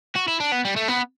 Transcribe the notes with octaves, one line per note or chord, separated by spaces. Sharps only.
F#4
E4
D4
B3
G3
A3
B3